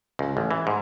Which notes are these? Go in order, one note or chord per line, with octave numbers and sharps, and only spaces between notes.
C#2
A1
E3
G#2